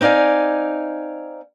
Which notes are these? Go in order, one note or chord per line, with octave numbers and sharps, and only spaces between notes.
C4 D#4 D5 F5 G#5